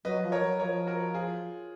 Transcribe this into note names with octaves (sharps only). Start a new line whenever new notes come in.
F#3 B4 D#5
F3
A#4 C#5
F#3
F3 A#4 C#5
F#4 A#4
F4 G#4